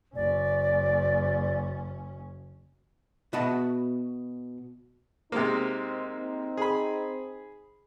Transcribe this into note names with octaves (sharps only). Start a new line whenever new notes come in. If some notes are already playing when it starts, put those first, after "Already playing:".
F#1 C#4 D5
B2 F#4 D#5 E5 A5 B5
C3 G#3 A#3 C4 D#4
G#4 B5